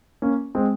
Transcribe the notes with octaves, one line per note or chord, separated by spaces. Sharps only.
A#3 C#4
G#3 C4